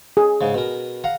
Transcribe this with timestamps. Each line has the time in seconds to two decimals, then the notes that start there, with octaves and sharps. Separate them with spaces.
0.17 G#4
0.41 G#2 C#3
0.54 B2 A#4
1.04 F5 F#5 A#5